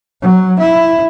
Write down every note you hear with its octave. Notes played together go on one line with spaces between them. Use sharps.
F#3
E4